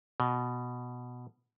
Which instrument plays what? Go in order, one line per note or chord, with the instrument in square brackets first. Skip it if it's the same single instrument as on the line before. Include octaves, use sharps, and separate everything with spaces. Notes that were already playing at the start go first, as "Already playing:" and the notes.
[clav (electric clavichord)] B2